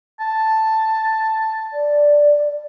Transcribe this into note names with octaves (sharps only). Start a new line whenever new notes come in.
A5
D5